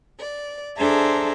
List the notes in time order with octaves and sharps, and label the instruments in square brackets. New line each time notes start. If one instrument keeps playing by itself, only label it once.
[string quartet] D5
D4 G#4 A4 C5 E5 A#5